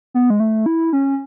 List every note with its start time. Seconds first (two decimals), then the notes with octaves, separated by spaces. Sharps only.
0.14 B3
0.30 G#3
0.40 A3
0.66 E4
0.93 C#4